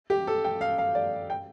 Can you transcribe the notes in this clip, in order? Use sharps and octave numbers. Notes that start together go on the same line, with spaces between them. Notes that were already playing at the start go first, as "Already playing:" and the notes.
G4
A4
G5
F5
F5
D5
G5